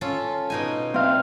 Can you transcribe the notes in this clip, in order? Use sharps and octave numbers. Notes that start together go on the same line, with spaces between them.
C#4 F4 A4
B2 D#4 G#5
C4 F5